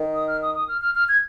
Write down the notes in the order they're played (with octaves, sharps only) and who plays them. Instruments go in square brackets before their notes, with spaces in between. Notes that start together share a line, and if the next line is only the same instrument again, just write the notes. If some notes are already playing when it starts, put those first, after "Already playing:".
Already playing: [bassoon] D#3
[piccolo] D#6
F6
D#6
D#6
F6
F6
F6
G#6